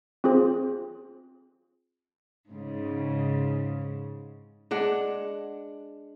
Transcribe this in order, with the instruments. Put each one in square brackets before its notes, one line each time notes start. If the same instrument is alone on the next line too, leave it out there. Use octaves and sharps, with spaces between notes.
[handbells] C4 F4 G#4 C5
[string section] G#2 C#3
[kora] G#3 D4 F#5